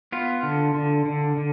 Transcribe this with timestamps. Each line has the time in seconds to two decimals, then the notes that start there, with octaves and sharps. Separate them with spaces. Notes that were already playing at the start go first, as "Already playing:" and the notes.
0.12 B3 F4
0.43 D3
0.75 D3
1.05 D3
1.37 D3